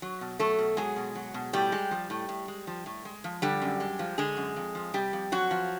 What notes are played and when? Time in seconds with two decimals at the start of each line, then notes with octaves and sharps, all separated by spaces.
0.02 F#3
0.21 B2
0.39 F#3 A3 A4
0.59 B2
0.77 F#3 G#3 G#4
0.96 B2
1.15 F#3
1.34 B2
1.53 A2 G3 G4
1.72 G#3
1.91 F3
2.10 A2
2.29 A2
2.48 G#3
2.67 F3
2.86 A2
3.05 G#3
3.24 F3
3.42 D3 G3 G4
3.62 F#2
3.80 G#3
3.99 F3
4.18 D3 G#3 G#4
4.37 F#2
4.56 F2
4.75 F3
4.94 C3 G3 G4
5.13 F2
5.32 F2 F#3 F#4
5.51 F3